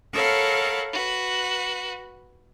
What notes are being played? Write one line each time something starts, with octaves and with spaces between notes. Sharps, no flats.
A4 A#4 C#5 F5 F#5 B5
F#4 B4